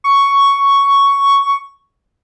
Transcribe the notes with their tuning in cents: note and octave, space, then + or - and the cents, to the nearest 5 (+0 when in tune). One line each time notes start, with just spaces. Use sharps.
C#6 +5